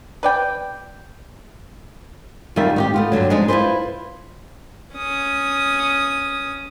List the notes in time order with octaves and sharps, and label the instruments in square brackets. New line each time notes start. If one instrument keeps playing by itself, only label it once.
[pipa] B4 D5 G5
[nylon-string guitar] F#2 D#3 G3 F4 E5
D#4 F#4 G4
A3 B3 F4
G2 B2 D3 F#3
F3 G#3 D4 D#4
E4 F4 G#4 B4 C5
[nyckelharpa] C#4 D#6